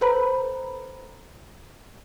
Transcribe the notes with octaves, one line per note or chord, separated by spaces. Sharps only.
A4 B4 C5 A#5 B5